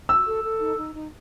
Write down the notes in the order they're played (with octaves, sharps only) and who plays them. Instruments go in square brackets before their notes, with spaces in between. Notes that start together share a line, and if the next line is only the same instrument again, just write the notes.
[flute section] F#4 [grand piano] E6
[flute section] A4
A4
D#4
D#4
D#4